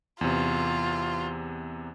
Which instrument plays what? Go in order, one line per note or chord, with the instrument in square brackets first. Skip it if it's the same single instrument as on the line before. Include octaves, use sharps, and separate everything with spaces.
[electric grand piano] E2 C3 [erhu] F4